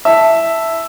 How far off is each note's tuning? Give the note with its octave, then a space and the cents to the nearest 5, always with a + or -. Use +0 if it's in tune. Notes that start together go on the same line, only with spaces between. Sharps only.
E4 +0 E5 +0 A5 +0